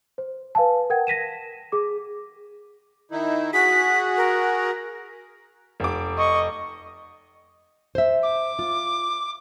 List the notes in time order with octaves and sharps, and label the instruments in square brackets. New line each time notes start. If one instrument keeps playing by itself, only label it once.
[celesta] C5
B4 F5 G#5 A5
A#4 F#5 G5 G#6
A#6 B6 D#7 E7
G#4 D6
[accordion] D#3 D#4 E4
[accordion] F#4 G#4 [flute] B6
[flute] A#4
[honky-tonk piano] F1 D6
[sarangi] D#5 [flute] C#6
[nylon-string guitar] C5 E5
[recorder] D6
[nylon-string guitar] F4